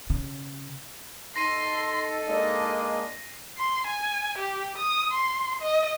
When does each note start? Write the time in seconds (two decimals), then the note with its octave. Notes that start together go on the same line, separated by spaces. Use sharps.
0.10 C#3
1.36 D#4 A4 C6 A#6 C7 D#7
2.26 G#3 A#3 D4 D#5
3.57 C6
3.87 G#5
4.38 G4
4.78 D#6
5.12 C6
5.61 D#5